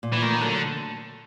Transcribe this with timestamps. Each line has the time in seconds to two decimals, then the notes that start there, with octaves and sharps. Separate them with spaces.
0.03 A#2
0.13 E3
0.22 D#3 A3
0.41 D3 F#3